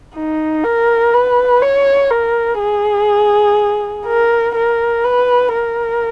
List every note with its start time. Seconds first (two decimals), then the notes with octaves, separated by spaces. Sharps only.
0.15 D#4
0.64 A#4
1.13 B4
1.62 C#5
2.11 A#4
2.60 G#4
4.06 A#4
4.55 A#4
5.04 B4
5.53 A#4